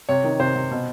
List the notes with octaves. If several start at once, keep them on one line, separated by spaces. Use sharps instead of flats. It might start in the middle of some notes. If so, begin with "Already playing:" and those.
C3 C#5
D#3
C3 C5
C3
B2